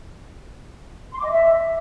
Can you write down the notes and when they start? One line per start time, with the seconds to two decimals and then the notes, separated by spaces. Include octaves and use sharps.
1.12 C6
1.18 D6
1.24 D#5
1.30 E5